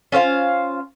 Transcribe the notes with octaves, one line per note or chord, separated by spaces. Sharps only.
C#4 F4 C5 F5